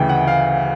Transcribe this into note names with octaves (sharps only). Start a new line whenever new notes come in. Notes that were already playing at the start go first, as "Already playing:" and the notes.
Already playing: D2 C#3 E3 G5
F#5
F5